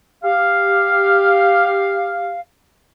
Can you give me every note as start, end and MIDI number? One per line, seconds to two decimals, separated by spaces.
0.23 2.41 67
0.23 2.41 77